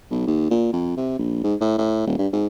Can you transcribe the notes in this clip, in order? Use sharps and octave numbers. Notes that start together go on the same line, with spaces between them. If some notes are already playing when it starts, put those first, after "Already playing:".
B1
D#2
A#2
F2
C3
A#1
G#2
A2
A2
D#1
G2
G#2